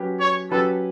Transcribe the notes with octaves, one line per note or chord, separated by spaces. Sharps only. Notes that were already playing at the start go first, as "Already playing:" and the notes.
Already playing: F#3 C#4 G4 B4
C#5
F#3 C#4 G4 A4 B4